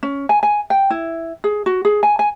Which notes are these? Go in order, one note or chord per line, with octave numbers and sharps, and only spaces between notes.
C#4
G#5
G#5
G5
E4
G#4
F#4
G#4
G#5
G#5